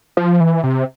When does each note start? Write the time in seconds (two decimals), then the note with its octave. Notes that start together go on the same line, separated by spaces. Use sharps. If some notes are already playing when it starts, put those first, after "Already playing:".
0.17 F3
0.40 E3
0.63 C3